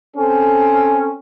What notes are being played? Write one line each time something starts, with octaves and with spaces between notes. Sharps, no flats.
C4 C#4 A4